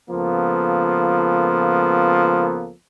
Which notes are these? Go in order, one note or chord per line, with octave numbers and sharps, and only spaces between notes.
C#2 F3 A#3 B3 A4